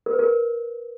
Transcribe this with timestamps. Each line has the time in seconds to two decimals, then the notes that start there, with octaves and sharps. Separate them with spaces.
0.06 A#4
0.13 B4
0.19 A#4